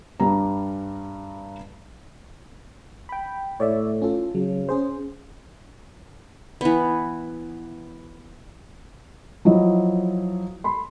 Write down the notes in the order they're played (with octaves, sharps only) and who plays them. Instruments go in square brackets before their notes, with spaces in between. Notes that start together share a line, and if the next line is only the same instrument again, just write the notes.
[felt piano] G2 G3 A#5
[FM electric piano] G5 B5
[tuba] A2 [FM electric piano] C#5 D5 E5
[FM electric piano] C#4 F4 A4
[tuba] C#3 [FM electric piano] F#3
[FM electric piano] C#4 G#4 C5
[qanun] E3 B3
[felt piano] F3 F#3 E4 D#5
B5 C6